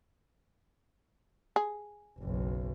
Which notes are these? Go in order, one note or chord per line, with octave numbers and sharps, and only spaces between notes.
G#4
F#1 B1